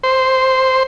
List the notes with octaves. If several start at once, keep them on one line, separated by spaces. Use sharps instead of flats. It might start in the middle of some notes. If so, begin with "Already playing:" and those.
C5